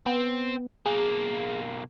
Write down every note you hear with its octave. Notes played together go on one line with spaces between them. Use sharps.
B3 C4
B1 A#3 G#4